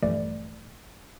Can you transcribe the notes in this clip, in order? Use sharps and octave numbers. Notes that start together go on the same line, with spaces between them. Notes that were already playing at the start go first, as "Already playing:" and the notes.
A#1 G2 E3 G3 A3 D5